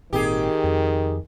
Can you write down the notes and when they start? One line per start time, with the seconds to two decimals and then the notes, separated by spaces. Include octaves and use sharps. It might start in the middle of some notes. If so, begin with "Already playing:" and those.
0.13 G#1 A#2 D#3 C4 G4 G#4
0.64 F2